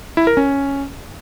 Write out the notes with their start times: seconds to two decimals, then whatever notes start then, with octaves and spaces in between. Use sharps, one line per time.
0.17 E4
0.27 A#4
0.37 C#4